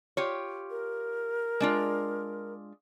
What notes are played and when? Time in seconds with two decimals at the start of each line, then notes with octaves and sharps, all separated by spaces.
0.17 F4 G4 C#5
0.70 A#4
1.60 G#3 D4 F4